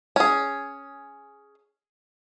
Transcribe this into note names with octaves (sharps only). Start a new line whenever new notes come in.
C#4 G#4